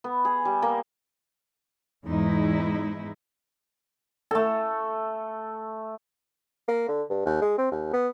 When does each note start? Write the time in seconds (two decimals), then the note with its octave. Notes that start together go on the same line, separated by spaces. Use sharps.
0.04 B3
0.25 G#4
0.45 G3
0.62 A#3
2.05 E2 G#2 G#3 D#4 E4
4.31 A3 A4
6.68 A#3
6.88 D3
7.10 G2
7.25 D#2
7.42 G#3
7.58 C4
7.72 D#2
7.93 B3